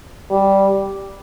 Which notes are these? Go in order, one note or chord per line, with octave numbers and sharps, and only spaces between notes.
G3